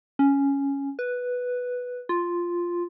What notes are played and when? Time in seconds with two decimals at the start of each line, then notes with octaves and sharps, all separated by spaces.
0.19 C#4
0.99 B4
2.09 F4